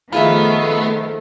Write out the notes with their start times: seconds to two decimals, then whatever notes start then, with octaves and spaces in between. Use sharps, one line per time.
0.12 D#3 F3 A3 B3 F4 G#4 E5